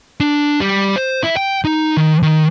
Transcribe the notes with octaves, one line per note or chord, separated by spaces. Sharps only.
D4
G3
C5
E4
G5
D#4
D#3
D#3